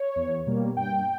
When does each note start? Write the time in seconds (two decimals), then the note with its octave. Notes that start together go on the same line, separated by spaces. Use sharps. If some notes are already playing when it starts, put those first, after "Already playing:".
Already playing: C#5
0.16 E2
0.46 B2 G3 A#3
0.76 G2 G5